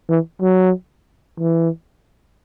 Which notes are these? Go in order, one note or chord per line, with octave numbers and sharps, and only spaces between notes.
E3
F#3
E3